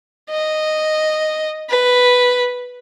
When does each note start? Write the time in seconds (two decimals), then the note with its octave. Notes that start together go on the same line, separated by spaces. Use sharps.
0.30 D#5
1.70 B4